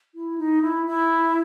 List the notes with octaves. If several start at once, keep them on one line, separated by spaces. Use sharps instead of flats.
E4
D#4
E4
E4